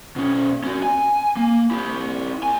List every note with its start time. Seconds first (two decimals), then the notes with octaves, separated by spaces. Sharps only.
0.16 B2 C#4
0.64 C#4 F#4
0.83 G#5
1.37 A#3
1.71 E4 G4
2.43 D#2 G#5